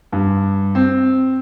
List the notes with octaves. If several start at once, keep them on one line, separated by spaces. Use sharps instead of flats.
G2
C4